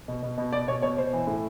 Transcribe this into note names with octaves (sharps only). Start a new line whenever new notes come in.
B2
B2
B2
B2 D5
B2 C#5
B2 C#5
B2 C5
E3
A2